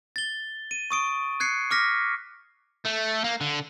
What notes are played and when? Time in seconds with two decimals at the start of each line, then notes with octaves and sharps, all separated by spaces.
0.16 A6 G7
0.71 D#7
0.91 C#6 D#6 D7
1.40 F#6 G#6 C7 C#7
1.71 D6 F6 A#6 B6
2.85 A3
3.24 A#3
3.41 D3